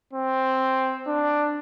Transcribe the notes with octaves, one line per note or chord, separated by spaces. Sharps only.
C4
D4